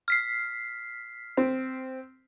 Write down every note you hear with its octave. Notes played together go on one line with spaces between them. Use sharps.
F6 B6 C7
C4